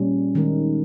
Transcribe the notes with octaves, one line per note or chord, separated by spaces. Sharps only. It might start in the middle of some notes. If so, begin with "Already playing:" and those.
Already playing: A#2 G3 C#4
D#3 G#3 D#4 A#4